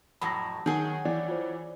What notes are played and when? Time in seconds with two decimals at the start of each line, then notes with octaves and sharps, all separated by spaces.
0.21 F2 A2 F#3 A5 B5 A#6
0.66 D#3 F#3 G#4
1.05 E3 D5 G5
1.29 F4 C5